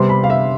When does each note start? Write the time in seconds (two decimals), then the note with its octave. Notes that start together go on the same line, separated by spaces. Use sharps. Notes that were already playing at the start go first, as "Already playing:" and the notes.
Already playing: C3 G3 B3 C6
0.09 B5
0.24 F5
0.30 E5